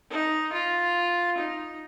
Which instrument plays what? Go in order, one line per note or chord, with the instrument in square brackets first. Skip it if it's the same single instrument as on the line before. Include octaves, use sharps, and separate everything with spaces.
[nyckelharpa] D#4
F4
D#4